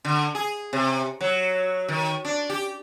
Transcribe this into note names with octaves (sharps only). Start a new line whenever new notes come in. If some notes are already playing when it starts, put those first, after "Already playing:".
D3
G#4
C3
F#3
D#3
D4
G4